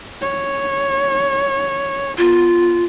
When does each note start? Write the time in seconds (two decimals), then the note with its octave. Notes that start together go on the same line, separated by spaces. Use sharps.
0.21 C#5
2.18 B3 F4